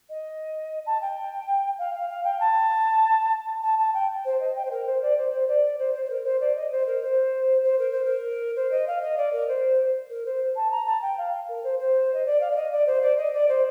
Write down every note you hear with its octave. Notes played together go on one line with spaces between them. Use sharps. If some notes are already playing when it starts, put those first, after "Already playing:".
D#5
A5
G5
F5
F5
F5
G5
A5
A5
A5
G5
C5
D#5
G5
C5
A#4
C5
D5
C5
C5
D5
C5
C5
C5
A#4
C5
D5
D#5
C5
A#4
C5
C5
A#4
C5
A#4
C5
D#5
F5
D#5
D5
A#4
C5
A#4
C5
A5
A#5
A5
G5
F5
A#4
C5
C5
D#5
D5
F5
D5
D#5
D5
C5
D5
D#5
D5
C5